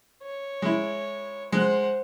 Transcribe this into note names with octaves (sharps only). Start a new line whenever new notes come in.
C#5
G#3 E4
G#3 C5 F#5 F#6